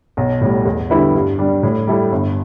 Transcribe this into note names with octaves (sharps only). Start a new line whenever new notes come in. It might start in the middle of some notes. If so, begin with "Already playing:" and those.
B1
A2 G3
E2
D3 G3 E4 B4
G2
G3 D4
A2
G3 E4 A4
G1